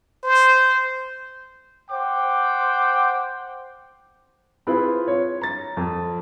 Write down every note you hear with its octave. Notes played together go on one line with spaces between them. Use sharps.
C5
C5 F#5 G5 D6
C4 E4 F4 G#4 B4
C#5
A#5 A6
F2